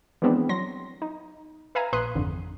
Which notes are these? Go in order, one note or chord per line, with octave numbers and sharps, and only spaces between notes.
E3 F3 G#3 B3 C4 D4
F#3 C6 A#6
D#4
B4 E5 F5 G#5 A#5
A#1 B4 C6 D#6 F#6
G#1 F2 D3